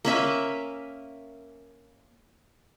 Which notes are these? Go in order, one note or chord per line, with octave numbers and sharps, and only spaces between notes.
A#3 C#4 E5 G#5